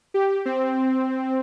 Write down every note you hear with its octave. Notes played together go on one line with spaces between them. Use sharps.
G4
C4